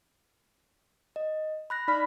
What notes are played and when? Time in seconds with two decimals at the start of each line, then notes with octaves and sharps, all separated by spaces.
1.16 D#5
1.70 B5 F#6 A#6
1.88 D#4 D5 B5 F6